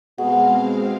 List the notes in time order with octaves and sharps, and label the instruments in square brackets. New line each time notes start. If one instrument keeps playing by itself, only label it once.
[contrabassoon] B2 [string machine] G#3 C4 F5 [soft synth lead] G#4 [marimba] F#5